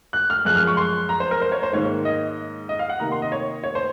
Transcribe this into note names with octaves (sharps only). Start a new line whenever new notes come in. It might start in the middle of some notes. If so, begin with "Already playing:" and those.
F#6
F6
F#2 F3 G#3 F#6
F6
C#6
C6
A#5
C5
A#4
C5
C#5
C5
G#2 D#3 A#3 C#5
D#5
D#5
F5
F#5
C3 D#3 A#3 A#5
C6
D#5
C#5
C#5
C5